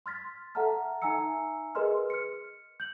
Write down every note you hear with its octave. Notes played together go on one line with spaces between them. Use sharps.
C6 F6 A6 B6
A4 E5 F#5 A5 A#5 F6
D#4 E5 G#5 A#5 E6 C#7
G#4 A#4 B4 D#5 C6 F6
F6 C#7
G6 F#7